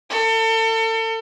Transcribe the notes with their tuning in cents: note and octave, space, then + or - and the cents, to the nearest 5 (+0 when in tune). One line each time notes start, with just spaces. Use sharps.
A4 +35